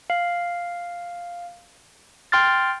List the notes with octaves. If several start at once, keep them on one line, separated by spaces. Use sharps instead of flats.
F5
G5 C6 F6 A6